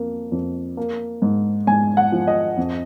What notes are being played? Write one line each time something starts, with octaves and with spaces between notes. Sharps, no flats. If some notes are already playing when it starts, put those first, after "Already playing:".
Already playing: F2 A#3
F2
A#3
G#2
G#2 G#5
F#5
F3
D#5
F2